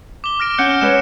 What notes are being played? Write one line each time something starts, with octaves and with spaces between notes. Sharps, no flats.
D6 G7
F6 A#6 D7
C#4 F#5 F#6 G6 C#7
G#3 B4 C#5 E7